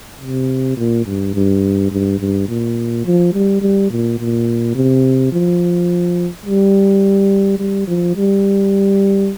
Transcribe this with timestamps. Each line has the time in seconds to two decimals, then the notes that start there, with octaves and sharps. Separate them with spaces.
0.21 C3
0.77 A#2
1.06 G2
1.34 G2
1.91 G2
2.20 G2
2.48 A#2
3.05 F3
3.33 G3
3.61 G3
3.90 A#2
4.19 A#2
4.75 C3
5.32 F3
6.46 G3
7.59 G3
7.87 F3
8.16 G3